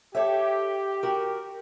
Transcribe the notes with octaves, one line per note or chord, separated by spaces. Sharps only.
G4 A4 C#5 E5
F#4 A#4